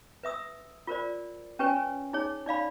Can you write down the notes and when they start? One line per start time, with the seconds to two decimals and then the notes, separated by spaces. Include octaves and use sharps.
0.24 B4 E5 D#6 E6
0.87 F4 A#4 C5 D5
1.59 C#4 G4 B4 C#5 G#5
2.13 D#4 G#4 C#5
2.46 D#4 D5 F5 B5